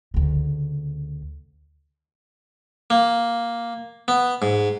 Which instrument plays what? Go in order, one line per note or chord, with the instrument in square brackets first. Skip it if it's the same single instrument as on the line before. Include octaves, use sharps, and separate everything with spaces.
[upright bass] D2 C#3
[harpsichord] A#3
B3
G#2